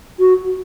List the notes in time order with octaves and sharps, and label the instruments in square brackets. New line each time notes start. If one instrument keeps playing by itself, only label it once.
[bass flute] F#4